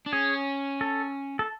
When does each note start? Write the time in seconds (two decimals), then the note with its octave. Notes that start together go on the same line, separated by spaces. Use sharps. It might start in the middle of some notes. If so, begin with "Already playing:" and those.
0.06 D4
0.13 C#4 G#4
0.81 A4
1.39 A4